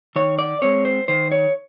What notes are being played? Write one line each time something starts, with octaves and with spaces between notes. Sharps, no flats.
D#3 C#5
D5
G#3 C4 C#5
C5
D#3 C5
C#5